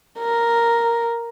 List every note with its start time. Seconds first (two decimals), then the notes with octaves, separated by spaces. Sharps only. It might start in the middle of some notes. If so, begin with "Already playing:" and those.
0.19 A#4